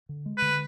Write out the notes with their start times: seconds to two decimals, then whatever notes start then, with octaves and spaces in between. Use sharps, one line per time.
0.09 D3
0.26 G#3
0.37 D3 B4